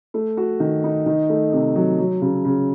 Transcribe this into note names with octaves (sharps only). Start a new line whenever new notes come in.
A3
F#4
D#3
D#4
D#3
A3
C3
F#3
F#3
C#3
C#3